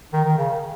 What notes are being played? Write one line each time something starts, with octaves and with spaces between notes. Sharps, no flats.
D#3
D#3
C#3